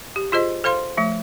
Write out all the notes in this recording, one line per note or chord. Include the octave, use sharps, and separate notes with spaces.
G4
F4 G#4 C5 D#5
A4 C5 F5 C6
F3 A3